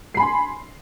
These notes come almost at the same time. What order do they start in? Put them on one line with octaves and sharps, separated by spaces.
C7 B5 G#5 C6